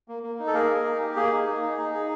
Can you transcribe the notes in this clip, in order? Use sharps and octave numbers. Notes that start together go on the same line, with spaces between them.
A#3
A#3
D#4
A4
A#3 G#4 A#4
A#3
D#4
G4
A#3 G#4
D#4
A#3
D#4
D#4
G#4